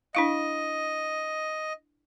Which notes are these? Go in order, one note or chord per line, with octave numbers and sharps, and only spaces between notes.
D4 E4 D#5 F5